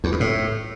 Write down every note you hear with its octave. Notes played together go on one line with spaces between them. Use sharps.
E2
G2
A2